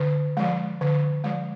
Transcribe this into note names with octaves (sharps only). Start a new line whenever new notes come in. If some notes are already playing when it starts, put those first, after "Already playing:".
Already playing: D3
F3 G#3
D3
F3 G#3